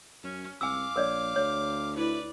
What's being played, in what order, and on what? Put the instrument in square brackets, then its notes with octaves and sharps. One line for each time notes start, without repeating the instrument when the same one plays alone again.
[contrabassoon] F#2 [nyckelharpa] C#4
[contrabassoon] C2 [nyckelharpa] F5 D6 [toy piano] G#5 E6
[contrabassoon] A#1 [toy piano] A#4 C#5 D5
[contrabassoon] D2 [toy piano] C#5
[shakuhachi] E4 [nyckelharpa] B4 D5